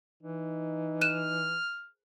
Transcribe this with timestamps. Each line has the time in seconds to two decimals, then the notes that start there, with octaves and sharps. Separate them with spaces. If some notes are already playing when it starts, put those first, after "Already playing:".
0.23 E3 D#4
1.01 F6 F#6 D#7 E7